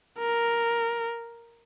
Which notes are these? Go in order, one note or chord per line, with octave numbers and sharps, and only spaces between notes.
A#4